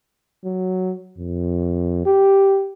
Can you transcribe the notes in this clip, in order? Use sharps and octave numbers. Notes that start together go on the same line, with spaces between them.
F#3
F2
G4